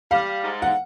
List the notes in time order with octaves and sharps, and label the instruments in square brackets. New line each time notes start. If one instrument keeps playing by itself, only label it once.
[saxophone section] G3 [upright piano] F5
[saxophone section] G#2
[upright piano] F#5